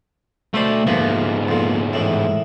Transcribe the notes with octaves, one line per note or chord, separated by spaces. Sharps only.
B2 A3 C5 D5 B5
D2 G#2 F3 A#3 B3
F2 A#2
A2 D#3 E3